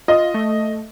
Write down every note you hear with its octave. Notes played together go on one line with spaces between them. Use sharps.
F4 D#5
A3